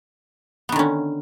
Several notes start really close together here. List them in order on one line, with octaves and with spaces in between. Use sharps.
B3 D#3 D3 C#4